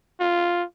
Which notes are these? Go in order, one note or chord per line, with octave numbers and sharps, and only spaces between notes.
F4